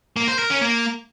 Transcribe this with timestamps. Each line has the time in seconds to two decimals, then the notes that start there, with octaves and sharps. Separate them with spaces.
0.17 A#3
0.28 C5
0.39 A#4
0.50 C#4
0.61 A#3